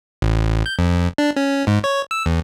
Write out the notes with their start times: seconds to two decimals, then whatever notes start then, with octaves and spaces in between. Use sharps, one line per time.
0.22 A1
0.66 G6
0.79 F2
1.18 D4
1.36 C#4
1.67 G#2
1.84 C#5
2.11 E6
2.26 E2